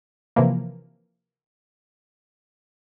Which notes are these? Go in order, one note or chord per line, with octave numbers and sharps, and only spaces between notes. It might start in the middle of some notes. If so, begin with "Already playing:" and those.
C3 E3 F3 A#3